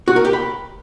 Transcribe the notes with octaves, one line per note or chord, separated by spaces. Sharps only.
F#4
A#4
G4
B5